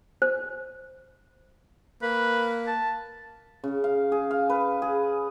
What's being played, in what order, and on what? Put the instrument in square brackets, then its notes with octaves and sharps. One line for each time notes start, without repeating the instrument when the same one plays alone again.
[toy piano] C5
[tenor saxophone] A#3 [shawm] B4
[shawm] A5
[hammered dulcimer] C#3
F5
G#4
F5
B4
G#4